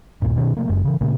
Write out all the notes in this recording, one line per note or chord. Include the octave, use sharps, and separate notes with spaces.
D#1 A#1 G2 A#2
B2 D#3 C4 C#4
C3 F3 A3 A#3
F#1 F#2 G#3
C#3 E3
A#2 C#3 A3 A#3